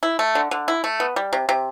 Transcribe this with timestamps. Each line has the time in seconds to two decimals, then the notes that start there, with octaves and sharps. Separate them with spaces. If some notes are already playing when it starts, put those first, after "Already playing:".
0.03 E4
0.19 A3
0.35 D3
0.51 D3
0.68 E4
0.84 A3
1.00 B3
1.16 G3
1.33 C3
1.49 C3